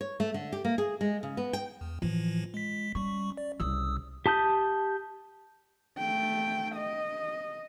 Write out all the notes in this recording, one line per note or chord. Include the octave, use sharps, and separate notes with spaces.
C#5
A3
D3
G4
A#3
G#4
G#3
C#3
B3
G5
E2
A2 E3 F3 F4
G#3 B6
G3 C#4 C#6
D5
C2 C#3 D#6 E6
G4 A5 D#6 G6
A3 G5
D#5